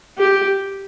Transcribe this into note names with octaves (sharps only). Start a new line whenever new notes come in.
G4